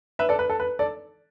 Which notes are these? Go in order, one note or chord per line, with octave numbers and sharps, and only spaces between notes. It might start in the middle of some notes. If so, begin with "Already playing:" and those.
B4 E5
A4 D5
B4
A4
B4
A4 D5